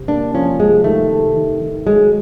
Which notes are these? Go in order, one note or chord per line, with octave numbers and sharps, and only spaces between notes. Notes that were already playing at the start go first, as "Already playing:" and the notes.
Already playing: C3
A#3 D4
F3 C#4
C3 G#3
D#3 A3
C3
D#3
D#3
F#3 G#3